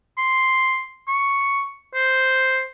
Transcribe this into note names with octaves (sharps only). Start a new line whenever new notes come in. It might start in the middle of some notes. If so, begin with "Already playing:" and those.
C6
C#6
C5